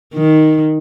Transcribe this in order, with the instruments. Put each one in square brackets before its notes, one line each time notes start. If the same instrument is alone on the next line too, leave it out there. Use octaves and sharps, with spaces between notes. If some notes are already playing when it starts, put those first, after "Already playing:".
[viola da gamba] D#3